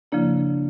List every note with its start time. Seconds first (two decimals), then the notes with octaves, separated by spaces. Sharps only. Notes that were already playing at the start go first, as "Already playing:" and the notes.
0.12 C#3 F3 A#3 D4 E4